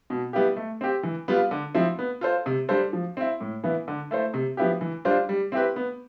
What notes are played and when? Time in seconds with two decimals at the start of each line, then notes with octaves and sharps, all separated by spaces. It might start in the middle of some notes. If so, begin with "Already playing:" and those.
0.10 B2
0.33 G3 B3 E4 G4
0.56 A3
0.81 C4 G4
1.03 E3
1.28 G3 B3 F4
1.51 D3
1.75 F3 C4 E4
1.99 B3
2.21 F4 A4 C5
2.46 C3
2.69 G3 D4 A4 C5
2.93 F3
3.17 C4 E4
3.40 A2
3.64 E3 B3 E4
3.88 D3
4.11 A3 E4 A4 C5
4.34 C3
4.57 F3 B3 E4 G4
4.81 E3
5.05 G3 D4 F4 C5
5.29 G3
5.52 C4 E4 G4 B4
5.76 B3